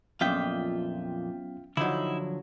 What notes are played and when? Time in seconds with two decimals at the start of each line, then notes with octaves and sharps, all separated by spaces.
0.21 F2 A#2 F#3 B3 C#4 F4 E5 G5
1.77 D3 F3 F#3 D#4 E4